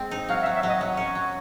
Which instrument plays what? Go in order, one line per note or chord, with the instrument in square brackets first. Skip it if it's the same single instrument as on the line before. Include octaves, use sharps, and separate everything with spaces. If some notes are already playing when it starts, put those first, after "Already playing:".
Already playing: [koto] G#3 C4
D#4
[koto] F#3 [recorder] F5
[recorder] E5
[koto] F#3
[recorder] E5
[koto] F#3 [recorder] D#5
[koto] F#3
C#4
F#3